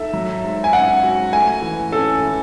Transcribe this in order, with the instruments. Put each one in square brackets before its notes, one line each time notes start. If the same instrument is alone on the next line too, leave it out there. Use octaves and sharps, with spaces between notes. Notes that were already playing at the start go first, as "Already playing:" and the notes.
Already playing: [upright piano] D#4 A4 [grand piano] E5
[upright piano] F#3
G#2
[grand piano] G#5
[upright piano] C#4 [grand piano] F#5
[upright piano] F#4
[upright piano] A3 [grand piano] G#5
[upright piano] E3
[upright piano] C#4 [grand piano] A4
[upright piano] E3